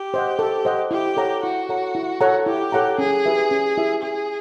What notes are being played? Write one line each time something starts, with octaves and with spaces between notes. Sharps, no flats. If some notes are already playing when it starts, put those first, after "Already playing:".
Already playing: G4
C5 D#5 F#5
A4
C5 D#5 F#5
E4 G4
A4 C#5 F#5 A#5
E4 F#4
A4 C#5 F#5 A#5
E4
A4 C#5 F#5 A#5
E4 G4
A4 C#5 F#5 A#5
C#4 G#4
E4 G4 B4 E5
C#4
E4 G4 B4 E5
C#4 G#4